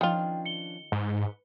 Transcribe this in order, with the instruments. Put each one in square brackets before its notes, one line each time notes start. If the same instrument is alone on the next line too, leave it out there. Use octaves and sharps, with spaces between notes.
[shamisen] D#3 F4 [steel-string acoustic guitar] F3 C#4 D4 [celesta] G5
[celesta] C#7 G7
[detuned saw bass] G#2 [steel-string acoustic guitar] B4